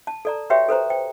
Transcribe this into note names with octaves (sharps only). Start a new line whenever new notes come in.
A5
A4 D5 A#5
F#4 G4 B4 C#5 E5 G5
A4 B4 C5 A#5
G5